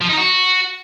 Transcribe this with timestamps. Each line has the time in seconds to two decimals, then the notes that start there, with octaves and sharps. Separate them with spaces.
0.01 F3
0.09 D#4
0.17 F#4